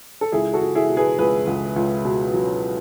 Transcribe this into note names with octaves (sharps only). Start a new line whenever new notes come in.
A4
C#2 E4 G#4
F#4 A4
C#2
E4 G#4
B2
G#4 B4
C#2 G#4 B4
C#2
C#2
B2
F#3